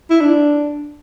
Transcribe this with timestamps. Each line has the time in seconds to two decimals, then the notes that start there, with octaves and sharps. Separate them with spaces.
0.10 E4
0.21 D4